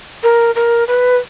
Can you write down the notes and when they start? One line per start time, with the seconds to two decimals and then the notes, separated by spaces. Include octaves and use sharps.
0.23 A#4
0.55 A#4
0.88 B4